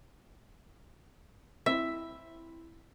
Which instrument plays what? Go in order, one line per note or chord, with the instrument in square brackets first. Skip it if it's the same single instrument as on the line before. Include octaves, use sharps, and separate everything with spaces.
[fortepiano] C4 E4 [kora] E5